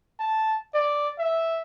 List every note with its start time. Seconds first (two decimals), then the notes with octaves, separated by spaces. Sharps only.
0.20 A5
0.74 D5
1.19 E5